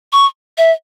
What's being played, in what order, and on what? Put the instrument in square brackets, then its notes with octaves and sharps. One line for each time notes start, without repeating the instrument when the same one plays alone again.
[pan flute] C#6
E5